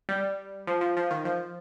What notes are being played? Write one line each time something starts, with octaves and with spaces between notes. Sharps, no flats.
G3
F3
F3
F3
D#3
F3